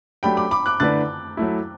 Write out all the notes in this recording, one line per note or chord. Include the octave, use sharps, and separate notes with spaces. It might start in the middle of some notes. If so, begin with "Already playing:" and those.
F#3 A3 D4 G4 G5 B5
B5 D6
B5 D6
D6 F#6
D3 A3 E4 B4 D5 F#6 A6
F#3 A3 E4